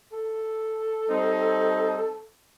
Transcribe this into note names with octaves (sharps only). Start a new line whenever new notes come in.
A4
G3 C4 D#4